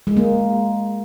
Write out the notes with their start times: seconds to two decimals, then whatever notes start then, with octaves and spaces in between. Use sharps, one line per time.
0.07 G#3
0.17 A#3